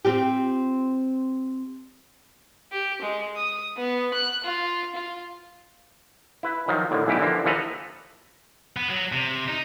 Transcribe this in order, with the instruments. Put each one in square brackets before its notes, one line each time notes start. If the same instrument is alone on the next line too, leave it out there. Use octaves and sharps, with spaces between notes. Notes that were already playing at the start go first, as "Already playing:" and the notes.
[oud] C4 F4 G4
[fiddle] G4
G#3
D#6
B3
F#6
F4
F4
[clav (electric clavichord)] E4 B4
D#3 F3 F#3
A2 D3 D#3
B1 A#2 E3 C#4 E4 G4
D3 E3 F3 A#3
D#2 E3 F3 A4 B4 A#5
[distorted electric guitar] B3
F#3
C3
D#4